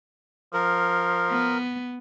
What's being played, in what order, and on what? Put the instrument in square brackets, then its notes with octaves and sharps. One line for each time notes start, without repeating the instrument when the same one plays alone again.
[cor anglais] F3 [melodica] A#4
[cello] B3